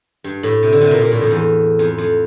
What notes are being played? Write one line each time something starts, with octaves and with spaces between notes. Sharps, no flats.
G2
A2
C3
D3
C3
A#2
A#2
A2
F2
E2
F2
F2